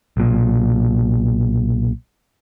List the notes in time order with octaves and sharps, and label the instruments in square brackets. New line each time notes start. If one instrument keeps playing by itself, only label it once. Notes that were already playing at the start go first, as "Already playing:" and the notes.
[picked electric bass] B1 A#2